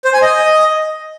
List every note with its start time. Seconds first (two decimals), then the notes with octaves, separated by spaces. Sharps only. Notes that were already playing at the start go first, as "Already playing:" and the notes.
0.05 C5
0.13 G#5
0.22 D#5